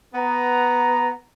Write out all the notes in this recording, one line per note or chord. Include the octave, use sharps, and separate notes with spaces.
B3 A#5